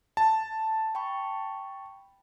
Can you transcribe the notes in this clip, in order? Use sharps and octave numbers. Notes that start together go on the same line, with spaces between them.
A5
G5 B5 C#6